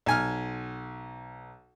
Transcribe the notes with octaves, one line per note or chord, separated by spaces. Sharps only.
B1 G#5 F6